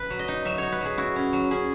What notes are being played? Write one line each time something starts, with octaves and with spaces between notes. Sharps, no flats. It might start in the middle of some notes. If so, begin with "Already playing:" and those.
Already playing: B4
F#3
D#5
D#4
F#3 E5
D#4 C#5
B4
F#3 G#4
E4 F#4
C#4
F#3
C#4 G#4